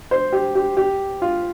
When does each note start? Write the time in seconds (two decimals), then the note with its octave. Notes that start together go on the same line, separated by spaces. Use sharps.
0.11 C5
0.32 G4
0.55 G4
0.77 G4
1.22 F4